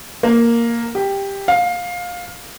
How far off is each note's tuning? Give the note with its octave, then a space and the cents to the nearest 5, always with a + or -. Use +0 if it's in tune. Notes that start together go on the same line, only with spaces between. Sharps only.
A#3 +0
G4 +10
F5 +20